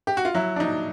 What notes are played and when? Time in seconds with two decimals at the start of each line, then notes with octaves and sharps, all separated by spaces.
0.07 G4
0.17 F#4
0.25 F4
0.34 F#3 E4
0.56 D4
0.60 F#3 D#4